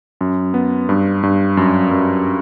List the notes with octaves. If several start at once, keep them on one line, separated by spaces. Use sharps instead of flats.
F#2
B3
G2
G2
F#2
F#2